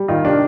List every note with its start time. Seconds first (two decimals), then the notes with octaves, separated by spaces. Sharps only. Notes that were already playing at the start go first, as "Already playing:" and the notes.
Already playing: G3
0.08 D#3 F4
0.24 C3 D4